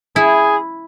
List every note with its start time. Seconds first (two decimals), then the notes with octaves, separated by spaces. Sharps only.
0.16 E4 G#4